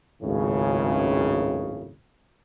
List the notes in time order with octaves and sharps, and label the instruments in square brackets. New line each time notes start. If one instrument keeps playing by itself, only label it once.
[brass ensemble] G#1 C#2 F#2 A2 C#3